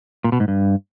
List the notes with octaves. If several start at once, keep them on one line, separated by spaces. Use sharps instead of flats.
A#2
B2
G#2
G2